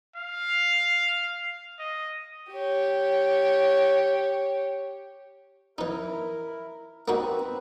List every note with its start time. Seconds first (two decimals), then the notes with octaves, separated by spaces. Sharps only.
0.16 F5
1.79 D#5
2.50 G4 C#5
5.78 E3 D#4 E4 A#4
7.08 A#3 C4 D#4 F#4 B4